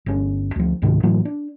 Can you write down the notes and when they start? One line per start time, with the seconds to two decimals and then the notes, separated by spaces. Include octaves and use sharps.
0.06 G1 A#2 C#4
0.56 D2 F3
0.82 C#2 G#2 C3 D#3
1.03 A2 E3 F#3 A#3
1.25 D4